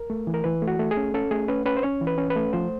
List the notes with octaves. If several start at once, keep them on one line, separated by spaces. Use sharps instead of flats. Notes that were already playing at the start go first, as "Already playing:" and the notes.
Already playing: A#4
A3
E3
A#4
E3 B4
A3
F#4
A3
G#4
C#4
C#4 A4
A3 G#4
C#4 B4
C#4 B4
C5
C#4 C#5
E3
B4
C#4
B4
A3
F3 C5